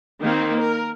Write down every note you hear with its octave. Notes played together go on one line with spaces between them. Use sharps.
D#3 A#3 C4
A#4